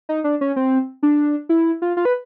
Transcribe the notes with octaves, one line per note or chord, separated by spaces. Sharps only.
D#4
D4
C#4
C4
D4
E4
F4
F4
B4